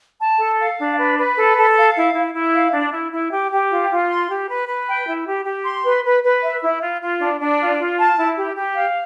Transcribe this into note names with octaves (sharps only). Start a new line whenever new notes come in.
A5
A4
F5
D4
B4
B4
A4
A4
F5
E4
E4
E4
F5
D4
E4
E4
G4
G4
F4
F4
C6
G4
B4
B4
G5
E4
G4
G4
C6
B4
B4
B4
E5
E4
F4
F4
D4
D4
F4
F4
A5
E4
G4
G4
F5